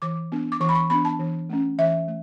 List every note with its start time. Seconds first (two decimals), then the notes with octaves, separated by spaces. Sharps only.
0.02 E3 D6
0.32 B3 D4
0.52 D6
0.60 E3 C#6
0.69 B5
0.75 C#6
0.90 B3 D4 B5
1.05 A5
1.19 E3
1.50 A3 C#4
1.79 E3 E5
2.08 A3